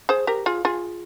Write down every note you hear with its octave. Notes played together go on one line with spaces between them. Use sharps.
G#4 C5
G4 A#4
F4 G#4
F4 G#4